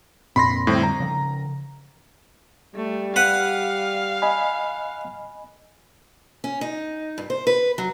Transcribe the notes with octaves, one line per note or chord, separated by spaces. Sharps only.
F2 A#2 C4 B5 C6 A#6
F2 A2 D3 G3 C4
A#5
C#3 F3
G3 A3
B4 F5 F#5
D#5 G#5 B5
C#4
D#4
G2
C5
B4
F#3